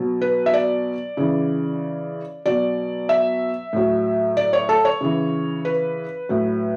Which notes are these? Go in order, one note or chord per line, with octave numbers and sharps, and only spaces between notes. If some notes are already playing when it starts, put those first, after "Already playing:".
Already playing: B2 F#3
B4
E5
D5
C#3 E3
B2 F#3 D5
E5
A2 F#3
D5
C#5
A4
C#5
C#3 E3
B4
A2 F#3